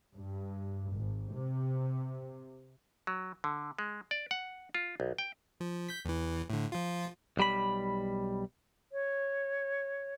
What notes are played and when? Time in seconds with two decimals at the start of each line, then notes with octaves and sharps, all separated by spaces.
0.14 G2
0.92 G#1
1.31 C3
3.07 F#3
3.44 D3
3.79 G#3
4.11 D5
4.31 F#5
4.74 F4
5.00 B1
5.18 G5
5.60 F3
5.89 G6 B6
6.05 E2 E3
6.50 A2 D3
6.72 F3 F4
7.37 B1 G3 B5
8.92 C#5